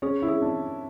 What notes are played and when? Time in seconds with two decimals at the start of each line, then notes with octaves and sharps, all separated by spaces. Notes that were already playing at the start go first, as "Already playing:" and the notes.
0.02 C#4 G#4
0.22 E4
0.28 G#4
0.42 D4